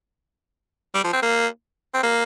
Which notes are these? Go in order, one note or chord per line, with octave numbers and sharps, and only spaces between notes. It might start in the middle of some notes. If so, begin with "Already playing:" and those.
G3
F3
C4
A#3
C4
A#3